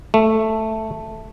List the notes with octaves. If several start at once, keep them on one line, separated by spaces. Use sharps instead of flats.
A3